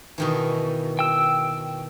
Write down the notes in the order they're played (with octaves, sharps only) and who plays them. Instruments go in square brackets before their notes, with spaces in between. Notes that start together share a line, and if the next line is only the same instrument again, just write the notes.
[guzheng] B2 D#3 E3
[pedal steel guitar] G5 E6